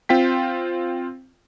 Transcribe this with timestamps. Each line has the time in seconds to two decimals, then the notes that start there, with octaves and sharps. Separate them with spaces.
0.09 C4 F4 G5 B6